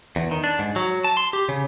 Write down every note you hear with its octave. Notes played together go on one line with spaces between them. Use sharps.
E2
D#3
D4
G#2
F#3
A5
C6
G4
C#3